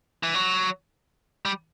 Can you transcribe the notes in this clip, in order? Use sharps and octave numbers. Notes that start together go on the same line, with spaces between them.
E3
F#3
G3